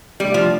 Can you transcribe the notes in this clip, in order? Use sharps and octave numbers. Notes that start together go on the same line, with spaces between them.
C3 G3 A3 D4
F3